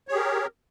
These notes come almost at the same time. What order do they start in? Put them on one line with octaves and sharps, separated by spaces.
C#5 G#4 G4 A#4